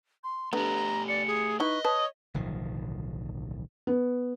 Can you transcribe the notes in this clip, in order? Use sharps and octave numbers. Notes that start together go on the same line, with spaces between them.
C6
D3 A3 B3 G4 A#5
D5 C#7
G#4
D#4 E4 B4 D#5 C#6
B4 C#5 A5 D#6
D1 B1 D#3 F3
B3